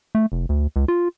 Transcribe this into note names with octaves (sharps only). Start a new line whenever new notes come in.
A3
F1
D2
C#2
F4